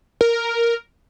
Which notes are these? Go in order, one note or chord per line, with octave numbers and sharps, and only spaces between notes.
A#4